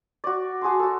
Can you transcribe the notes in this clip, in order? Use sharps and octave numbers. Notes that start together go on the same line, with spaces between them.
F#4 D5
F#4 G#4 A5 C6
F#4 A4